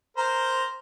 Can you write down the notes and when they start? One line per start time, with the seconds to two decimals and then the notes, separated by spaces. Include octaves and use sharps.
0.17 A#4 C5 A#5